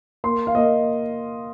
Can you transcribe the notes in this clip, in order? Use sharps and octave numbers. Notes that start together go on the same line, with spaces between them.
A#3 C6
F5
A#3 D#5